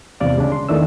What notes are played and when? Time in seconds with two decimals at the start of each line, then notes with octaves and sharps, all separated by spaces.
0.20 E2 C3 D5 F5
0.37 D2 C#3 G#3 D4
0.52 C6
0.69 E2 D#3 E3 A3 D4 E6